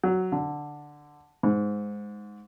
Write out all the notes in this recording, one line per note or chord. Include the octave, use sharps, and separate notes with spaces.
F#3
D3
G#2